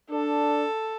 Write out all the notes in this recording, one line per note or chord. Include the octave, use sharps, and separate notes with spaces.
D4 A4